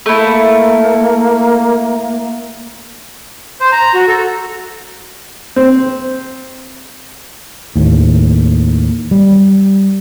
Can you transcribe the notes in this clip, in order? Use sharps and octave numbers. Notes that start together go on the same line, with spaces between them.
A3 A#3 E4
C5
A#5
F#4
A4
C4
D#2 A2
G3